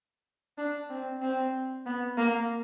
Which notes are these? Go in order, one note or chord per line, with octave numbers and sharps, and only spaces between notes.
D4
C4
C4
B3
A#3